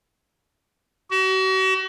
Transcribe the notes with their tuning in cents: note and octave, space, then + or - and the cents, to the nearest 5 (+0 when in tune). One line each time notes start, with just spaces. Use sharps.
F#4 +40